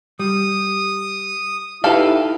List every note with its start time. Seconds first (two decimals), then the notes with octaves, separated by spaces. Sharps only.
0.19 G3 D#6
1.84 D#4 E4 G4 A4 B4 F5